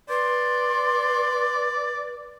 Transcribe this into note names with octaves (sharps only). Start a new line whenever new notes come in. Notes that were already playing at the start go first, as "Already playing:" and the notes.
B4 D5 C6